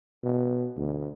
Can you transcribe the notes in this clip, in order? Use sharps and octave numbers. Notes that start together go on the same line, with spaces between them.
B2
D2